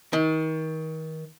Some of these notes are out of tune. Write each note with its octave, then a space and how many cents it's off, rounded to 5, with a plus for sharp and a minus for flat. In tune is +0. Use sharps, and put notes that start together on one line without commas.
D#3 +30